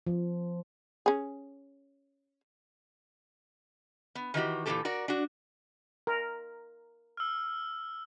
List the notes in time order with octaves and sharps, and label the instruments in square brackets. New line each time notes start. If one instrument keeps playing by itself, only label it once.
[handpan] F3
[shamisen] C#4 G#4
[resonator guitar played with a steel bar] B3
D#3 E3 F#4 G4
A#2 E3 F#3 B3 G4 A4
F#4 A#4 D5
D4 F#4
[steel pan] A#4
[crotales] E6 F6